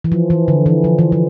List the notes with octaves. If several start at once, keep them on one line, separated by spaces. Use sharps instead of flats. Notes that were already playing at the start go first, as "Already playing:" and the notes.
E3
F3
E3
D3
E3
F3
E3
F3